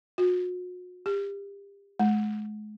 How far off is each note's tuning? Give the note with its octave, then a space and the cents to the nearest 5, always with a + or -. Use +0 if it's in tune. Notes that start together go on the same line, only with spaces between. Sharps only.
F#4 -40
G4 +30
G#3 +40